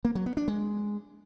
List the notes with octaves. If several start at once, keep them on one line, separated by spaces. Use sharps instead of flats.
A#3
F#3
B3
D4
G#3